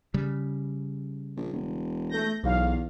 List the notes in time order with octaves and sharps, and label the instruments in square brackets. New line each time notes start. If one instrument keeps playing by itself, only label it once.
[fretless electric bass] C#3 G3
[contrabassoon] A#1
E1
[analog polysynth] A3 G6 A#6
[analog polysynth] B1 F5 [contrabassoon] E2